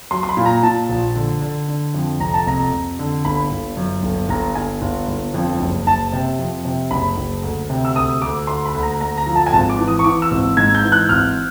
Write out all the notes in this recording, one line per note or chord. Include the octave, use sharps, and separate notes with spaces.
F#3 C6
C6
B5
A#2
A#5
A#2 A5
A#1
D3
D3
D3
F2
F1 A#5
A5
F1 A#5
F1
D3
G1 B5
G1
F#2
G1
G1 A#5
G1 G#5
G1
G1
F2
F#1
F#1 A5
C3
F2
C3
F#1 B5
F#1
D2
C3
E6
D2 D#6
D2 D6
D2 C6
B5
D2
A#5
D2 A#5
A#5
F3
A5
G#5
G#1 A5
D6
E3
D#6
C#6
E3 D6
E6
G#1
G#2 G#6
G6
E3
F#6
G#1 F6